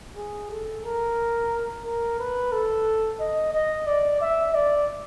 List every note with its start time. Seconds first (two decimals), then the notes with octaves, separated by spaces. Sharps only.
0.17 G#4
0.51 A4
0.85 A#4
1.85 A#4
2.19 B4
2.52 A4
3.20 D#5
3.53 D#5
3.87 D5
4.21 E5
4.55 D5